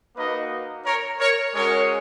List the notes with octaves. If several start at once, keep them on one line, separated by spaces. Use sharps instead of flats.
A#3 D#4 F#4 B4 D#5
A#4 C#5
A#4 C#5
G#3 C#4 F#4 A#4 C#5